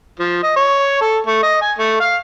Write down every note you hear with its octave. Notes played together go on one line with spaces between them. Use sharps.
F3
D#5
C#5
A4
A3
D#5
G#5
A3
F5